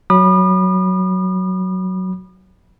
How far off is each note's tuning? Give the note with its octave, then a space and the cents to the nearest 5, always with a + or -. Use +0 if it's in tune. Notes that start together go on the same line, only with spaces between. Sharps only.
F#3 +5 B5 -20 D#6 -45